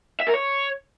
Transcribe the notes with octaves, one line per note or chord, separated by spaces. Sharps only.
E5
A#4
C#5